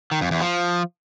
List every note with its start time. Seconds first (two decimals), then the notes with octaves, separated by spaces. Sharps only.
0.11 D#3
0.21 F2
0.31 E2
0.41 F3